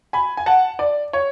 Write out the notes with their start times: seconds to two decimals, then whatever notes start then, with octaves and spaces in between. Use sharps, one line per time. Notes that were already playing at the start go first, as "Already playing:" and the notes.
0.13 G#5 B5
0.37 G#5
0.46 F#5 A5
0.79 D5
1.13 C#5